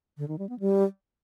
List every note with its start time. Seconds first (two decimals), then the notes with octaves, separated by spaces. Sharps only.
0.18 D3
0.28 D#3
0.39 G3
0.49 B3
0.60 G3